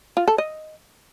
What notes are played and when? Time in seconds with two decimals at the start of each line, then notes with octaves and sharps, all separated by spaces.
0.17 F4
0.28 A4
0.38 D#5